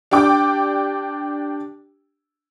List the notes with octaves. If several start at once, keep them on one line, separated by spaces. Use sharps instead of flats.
D4 G4 G5 D6